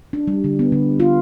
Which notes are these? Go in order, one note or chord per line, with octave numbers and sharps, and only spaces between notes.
D4
G3
D3
B3
D3
F4